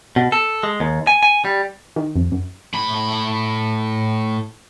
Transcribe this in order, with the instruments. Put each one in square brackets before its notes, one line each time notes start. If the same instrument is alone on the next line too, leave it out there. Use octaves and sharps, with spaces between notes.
[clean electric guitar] B2
A4
G#3
D#2
G#5
G#5
G3
[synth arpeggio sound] D#3
F2
F#2
[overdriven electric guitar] A2 B5